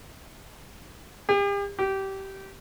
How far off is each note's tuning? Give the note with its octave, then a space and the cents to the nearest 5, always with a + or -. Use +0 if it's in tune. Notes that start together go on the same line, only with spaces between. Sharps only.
G4 +40
G4 -20